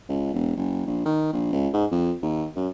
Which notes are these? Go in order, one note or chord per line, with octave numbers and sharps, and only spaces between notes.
C#2
E1
F#1
A#1
D#3
A#1
C#2
G#2
F2
D#2
F#2